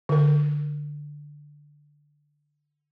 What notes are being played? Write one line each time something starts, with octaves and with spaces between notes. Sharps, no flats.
D3 A#4